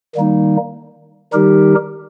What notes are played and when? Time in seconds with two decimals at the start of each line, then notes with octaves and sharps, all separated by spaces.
0.15 D#3 G3 A#3 D#4
1.33 D#3 G3 D#4 G4 A#4